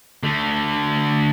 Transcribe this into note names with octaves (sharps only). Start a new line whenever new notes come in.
D3 A3